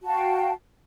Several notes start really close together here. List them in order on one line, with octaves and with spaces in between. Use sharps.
F#4 A5 F5 G5